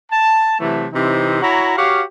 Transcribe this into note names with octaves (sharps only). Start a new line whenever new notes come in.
A5
C3 E3 F#3 A3
C3 E3 C4 D#4
E4 F#4 C#5 A#5
F#4 G4 C#5 F5